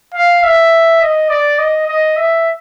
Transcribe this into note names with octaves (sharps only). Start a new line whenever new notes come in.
F5
E5
D#5
D5
D#5
D#5
E5